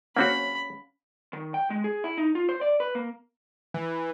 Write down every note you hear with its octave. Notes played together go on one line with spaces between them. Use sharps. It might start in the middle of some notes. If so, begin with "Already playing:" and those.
A#3 C4 C#4 F#4 F5 F#5 B5
D#3
G5
G#3
G#4
E4
D#4
F4
C5
D5
B4
A#3
E3